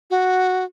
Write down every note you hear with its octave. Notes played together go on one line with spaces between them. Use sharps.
F#4